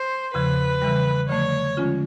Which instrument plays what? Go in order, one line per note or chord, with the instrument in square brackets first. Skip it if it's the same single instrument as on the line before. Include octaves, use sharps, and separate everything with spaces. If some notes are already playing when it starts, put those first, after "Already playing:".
Already playing: [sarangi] C5
[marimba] E2 C#3 F3 [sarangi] B4
[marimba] C#3 E3 G3
[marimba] D3 F3 A3 [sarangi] C#5
[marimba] D3 F3 G#3 C#4 F4